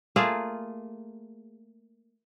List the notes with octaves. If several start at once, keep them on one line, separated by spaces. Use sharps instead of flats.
A3 A#3 F4 G#4